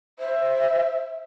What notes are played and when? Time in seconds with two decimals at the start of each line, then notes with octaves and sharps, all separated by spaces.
0.19 C5 E5